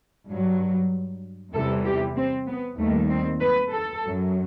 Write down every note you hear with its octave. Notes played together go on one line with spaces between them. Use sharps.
G2 F#3
E2 C3 E3 G3 A4
G4
C4
B3
D#2 D#3 G3 A3
C4
B4
A4
F#2 F#3